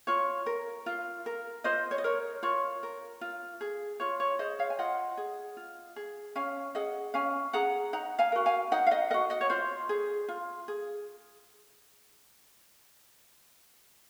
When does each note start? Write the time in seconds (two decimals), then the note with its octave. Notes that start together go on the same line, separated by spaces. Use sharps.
0.07 F4 C#5
0.46 A#4
0.86 F4
1.26 A#4
1.64 F4 C5 D#5
1.91 C#5
1.98 D#5
2.04 A#4 C#5
2.43 F4 C#5
2.83 A#4
3.21 F4
3.61 G#4
4.00 F4 C#5
4.20 C#5
4.39 G#4 C5 D#5
4.59 C#5 F5
4.70 G#5
4.79 F4 D#5 F#5
5.17 G#4
5.57 F4
5.96 G#4
6.35 C#4 F5 G#5
6.75 G#4 D#5 F#5
7.14 C#4 F5 G#5
7.53 G#4 F#5 A#5
7.93 D#4 F#5 A#5
8.19 F5 G#5
8.32 F#4 A#4
8.46 F5 G#5
8.72 D#4 D#5 F#5
8.87 F5
8.91 D#5 F#5
9.10 F#4 A#4 D#5 F#5
9.30 D#5 F#5
9.41 C#5
9.50 F4 C5
9.89 G#4
10.28 F4
10.68 G#4